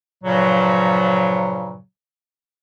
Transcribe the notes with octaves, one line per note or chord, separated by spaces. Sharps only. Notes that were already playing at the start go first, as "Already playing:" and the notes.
G2 A#2 C#3 F3 F#3